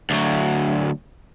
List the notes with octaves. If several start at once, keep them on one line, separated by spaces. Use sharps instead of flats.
D2 F#3